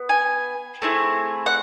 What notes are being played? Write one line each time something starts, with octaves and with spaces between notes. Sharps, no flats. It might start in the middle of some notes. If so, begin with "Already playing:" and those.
Already playing: B3
G#5
A3 C4 E4 G#4
F#5